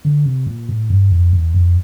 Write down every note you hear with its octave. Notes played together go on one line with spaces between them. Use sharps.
D3
C3
A#2
A2
G2
F2
E2
F2